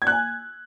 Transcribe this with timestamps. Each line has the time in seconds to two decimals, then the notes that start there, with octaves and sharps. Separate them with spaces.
0.02 G#6
0.07 F#6
0.12 G#5